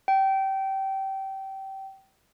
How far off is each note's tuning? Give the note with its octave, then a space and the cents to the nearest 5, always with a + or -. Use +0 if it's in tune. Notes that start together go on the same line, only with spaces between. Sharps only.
G5 -20